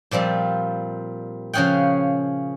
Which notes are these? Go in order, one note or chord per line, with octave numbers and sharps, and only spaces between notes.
A#2 F3 G3 C4
C#3 F3 C#4 G#4 F#5 G5